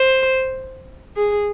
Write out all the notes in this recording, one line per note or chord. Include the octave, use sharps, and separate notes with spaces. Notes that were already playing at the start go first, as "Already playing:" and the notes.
Already playing: C5
G#4